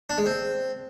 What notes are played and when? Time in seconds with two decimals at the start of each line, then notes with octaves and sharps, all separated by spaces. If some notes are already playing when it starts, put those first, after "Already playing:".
0.10 D4
0.18 G#3
0.26 C4